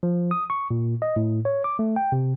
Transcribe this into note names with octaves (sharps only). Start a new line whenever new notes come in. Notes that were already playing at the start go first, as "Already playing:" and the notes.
F3
D#6
C#6
A#2
D#5
A2
C#5
D6
A3
G5
C3